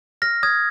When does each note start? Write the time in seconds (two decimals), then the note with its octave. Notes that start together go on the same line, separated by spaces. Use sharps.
0.22 F6 A#6
0.43 D#6 G#6